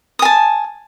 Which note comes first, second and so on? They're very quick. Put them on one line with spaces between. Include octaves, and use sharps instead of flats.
D#6 G#5 A5